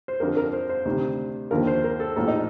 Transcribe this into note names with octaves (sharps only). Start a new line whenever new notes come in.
C5
F2 D3 F3 A#4
A#4
C5
C5
D2 C3 D#3
D#2 D3 F3 A#4
C5
A#4
A4
A#1 A2 F3 A4
D#4